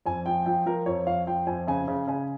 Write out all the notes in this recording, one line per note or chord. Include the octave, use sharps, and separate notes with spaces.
F2 G#5
F3 G5
F3 G5
F3 A#4
F2 C#5
F2 F5
F3 G5
F2 G#5
C#3 G#5
C#3
C#3 G#5